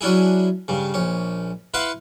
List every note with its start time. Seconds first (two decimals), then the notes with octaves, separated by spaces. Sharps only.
0.01 F#3 C#4 D4 E4 G#4
0.68 G2 C#3
0.94 A#1 C#4
1.74 E4 B4 F5 F#5 C6